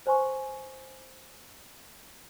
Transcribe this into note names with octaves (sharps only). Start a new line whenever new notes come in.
B4 C5 G#5 C6 C#6